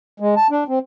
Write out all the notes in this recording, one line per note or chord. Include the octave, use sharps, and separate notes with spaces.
G#3
A5
D4
C4